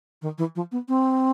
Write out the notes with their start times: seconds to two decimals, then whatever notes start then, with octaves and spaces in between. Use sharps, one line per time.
0.22 D#3
0.38 E3
0.55 F3
0.72 B3
0.88 C4